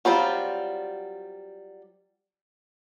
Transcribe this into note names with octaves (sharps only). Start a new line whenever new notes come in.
F#3 G3 C4 F4